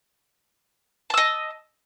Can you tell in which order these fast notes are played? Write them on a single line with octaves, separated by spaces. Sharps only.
A5 E6 D#5